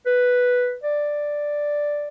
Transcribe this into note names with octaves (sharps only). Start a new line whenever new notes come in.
B4
D5